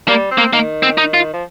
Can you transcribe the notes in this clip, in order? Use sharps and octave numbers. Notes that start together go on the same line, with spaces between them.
G3 A#3
C4
A#3
D#3 A#3
C4
D#4
F4
F3